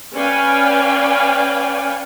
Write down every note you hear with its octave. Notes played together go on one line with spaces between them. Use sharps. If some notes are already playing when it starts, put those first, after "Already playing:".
C#4 B4 D5 F5 G5 G#5